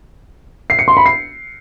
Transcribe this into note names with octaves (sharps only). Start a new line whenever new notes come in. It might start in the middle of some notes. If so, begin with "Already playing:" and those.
C7
C#7
C6
B5
C7